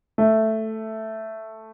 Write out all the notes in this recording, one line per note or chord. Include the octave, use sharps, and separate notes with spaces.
A3